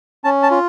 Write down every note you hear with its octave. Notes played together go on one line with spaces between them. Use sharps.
C#4 A5
A5
F4